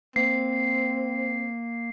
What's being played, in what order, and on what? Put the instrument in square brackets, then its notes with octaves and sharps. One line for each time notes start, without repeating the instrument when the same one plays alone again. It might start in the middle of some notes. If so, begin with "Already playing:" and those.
[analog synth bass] A#3 [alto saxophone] C4 [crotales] C7